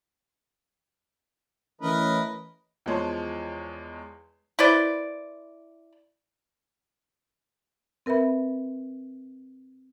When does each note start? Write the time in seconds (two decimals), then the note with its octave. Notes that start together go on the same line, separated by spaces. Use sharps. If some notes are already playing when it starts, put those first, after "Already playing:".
1.81 E3 A3 C#4 A#4 B4 D#5
2.86 E2 F3 G#3 C#5 A5 C6
4.59 E4 B4 C5 D5
8.06 C4 A#4 B4 E5 B5